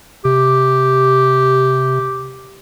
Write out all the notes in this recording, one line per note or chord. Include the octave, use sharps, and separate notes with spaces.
C3 G4